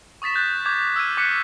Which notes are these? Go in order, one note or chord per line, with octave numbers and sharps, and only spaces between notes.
C#6 D#6 A6 B6 E7
D#6 F#6 G6 A6
D6 G6 G#6
E6 F6 G#6 D#7
D6 F#6 B6 C#7